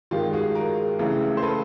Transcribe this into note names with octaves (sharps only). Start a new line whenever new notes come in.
G2 D#3 G#3 F4 G4
F#4 G#4
G#4 A#4
C#2 C#3 E3 A3
C5
A4 B4